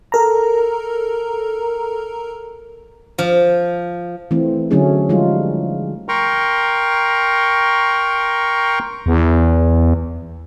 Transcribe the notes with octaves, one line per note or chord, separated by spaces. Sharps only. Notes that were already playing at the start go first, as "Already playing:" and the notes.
A4 A#4 A#5
F3
E3 A3 C4
D3 F#3 A3 C#4 E4 G#4
F3 G3 G#3 D#4 F4
A#4 G5 A#5 C6 C#6
E2